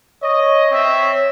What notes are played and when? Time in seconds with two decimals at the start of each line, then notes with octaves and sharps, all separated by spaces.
0.23 C#5 D#5
0.72 C4 E5